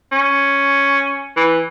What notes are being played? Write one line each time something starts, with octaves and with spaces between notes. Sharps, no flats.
C#4
E3